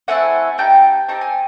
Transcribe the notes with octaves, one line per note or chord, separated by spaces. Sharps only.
A3 C4 E4 A4 F#5 G#5
B3 D#4 G4 G5 A5
C4 D#4 G4 A5
G#5